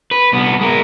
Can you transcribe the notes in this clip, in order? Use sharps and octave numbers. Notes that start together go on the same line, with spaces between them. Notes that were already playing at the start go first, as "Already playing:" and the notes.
B4
C2 B3
G#3 A#4